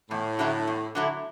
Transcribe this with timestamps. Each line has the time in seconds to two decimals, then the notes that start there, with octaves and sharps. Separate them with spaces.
0.11 E2 A2
0.39 D3 F#3 A3 E4
0.67 E2
0.95 D3 F#3 A3 E4